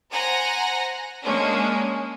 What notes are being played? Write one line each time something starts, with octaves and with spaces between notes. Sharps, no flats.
C5 F#5 G#5 A#5 A#6
G#3 A#3 C#4 D4